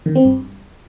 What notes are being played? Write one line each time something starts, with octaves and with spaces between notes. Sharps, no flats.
D#3
C4
G2